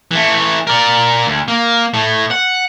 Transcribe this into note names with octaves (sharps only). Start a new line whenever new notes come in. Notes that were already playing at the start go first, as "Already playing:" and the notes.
E3 A3
A#4 D5
D2
A#3
A2 A3
F#5